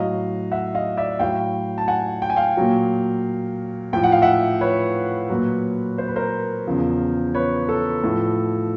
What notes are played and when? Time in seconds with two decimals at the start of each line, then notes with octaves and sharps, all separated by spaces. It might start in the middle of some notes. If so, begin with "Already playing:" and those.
Already playing: A2 F#3 D#5 F5
0.51 E5 F#5
0.75 D#5 F5
0.97 D5 E5
1.19 A2 F#3 F5 G5
1.78 A5
1.88 F#5 G#5
2.22 G5
2.30 G#5
2.36 F5 G5
2.57 A#2 F#3
3.93 A2 F3 G5
4.03 F#5
4.12 F5
4.22 E5 F#5
4.61 B4 C#5
5.30 A#2 F#3
5.98 C5
6.08 B4
6.16 A#4 C5
6.67 E2 C#3 F3
7.34 B4 C#5
7.69 A4
8.04 A2 F3